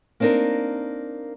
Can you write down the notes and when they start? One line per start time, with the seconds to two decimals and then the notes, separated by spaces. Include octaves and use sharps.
0.20 A#3 C4 D4 D#4 A#4